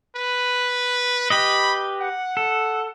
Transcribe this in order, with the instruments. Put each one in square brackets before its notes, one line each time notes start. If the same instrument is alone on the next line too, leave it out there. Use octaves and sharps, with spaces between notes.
[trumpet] B4
[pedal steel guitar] G4 B4 D#5 [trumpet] B5
[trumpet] F#5
[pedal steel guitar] A4